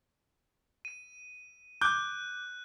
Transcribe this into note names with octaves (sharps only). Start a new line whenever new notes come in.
D#7
D6 F#6 G6